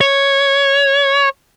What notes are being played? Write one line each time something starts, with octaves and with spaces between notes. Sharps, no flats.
C#5